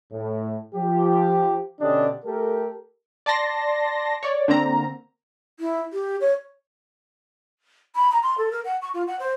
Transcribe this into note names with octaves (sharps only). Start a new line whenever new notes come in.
A2
F3 G4
B2 D3 C#4 D4 G4 D#5
A3 G4 A4 A#4
D5 A5 C6 A#6
C#5 D5
D3 A#3 C4 A#5
E4
G4
C#5
B5
A#5
C6
A4
A#4
F#5
C#6
F4
F#5
C5